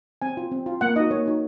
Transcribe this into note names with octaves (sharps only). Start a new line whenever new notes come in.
C4 G#5
F4
C4
F4
A#3 F#5
D#4 F#4 D#5
A#3 C#5
D#4 F#4